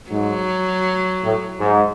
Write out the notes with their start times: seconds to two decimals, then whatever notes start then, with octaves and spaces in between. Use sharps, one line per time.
0.10 G#2 F#3
1.22 A2
1.59 G#2